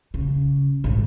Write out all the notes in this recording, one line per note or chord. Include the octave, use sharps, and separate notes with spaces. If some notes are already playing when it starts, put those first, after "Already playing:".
C#3
G#2 D3